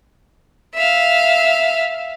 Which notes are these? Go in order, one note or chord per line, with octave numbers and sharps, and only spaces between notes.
E5 F5